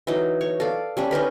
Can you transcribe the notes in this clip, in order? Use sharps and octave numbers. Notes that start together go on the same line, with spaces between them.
E3 F#3 D#4
C#5
A4 D5 F5
G3 C#4 D4
C#4 D#4 A#4 B4